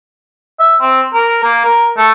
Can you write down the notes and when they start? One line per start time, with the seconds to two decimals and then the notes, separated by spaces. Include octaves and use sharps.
0.59 E5
0.81 C4
1.14 A#4
1.44 A#3
1.64 A#4
1.98 A3